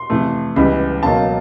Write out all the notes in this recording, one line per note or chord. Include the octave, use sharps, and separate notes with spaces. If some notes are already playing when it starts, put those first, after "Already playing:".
Already playing: C6
F2 C3 E3 A3
C#2 C#3 E3 G3 B3 B5
C#2 B2 F#3 A#3 A5